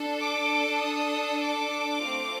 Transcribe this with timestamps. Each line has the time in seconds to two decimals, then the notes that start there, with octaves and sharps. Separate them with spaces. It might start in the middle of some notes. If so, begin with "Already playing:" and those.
Already playing: D4 A4
0.21 D6
0.81 D#6
1.43 D6
2.04 A3 C4 F4